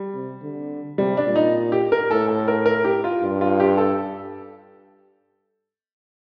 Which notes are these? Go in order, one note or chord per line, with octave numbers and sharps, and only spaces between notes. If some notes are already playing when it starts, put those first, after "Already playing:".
Already playing: G3
C3
D3
C3 G3
D4
A#2
D#4
G4
A#4
A2 A4
A4
A#4
A#4
G4
F4
G2
F4
G4
A4